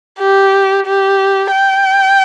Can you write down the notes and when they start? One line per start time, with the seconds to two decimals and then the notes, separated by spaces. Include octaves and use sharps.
0.20 G4
0.87 G4
1.53 G5